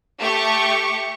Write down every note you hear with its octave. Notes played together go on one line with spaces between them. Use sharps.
A3 G4 C#6